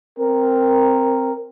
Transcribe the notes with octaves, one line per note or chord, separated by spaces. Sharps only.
C4 A#4